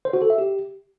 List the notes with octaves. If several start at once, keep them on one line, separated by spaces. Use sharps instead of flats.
C5
F#4
A4
E5
G4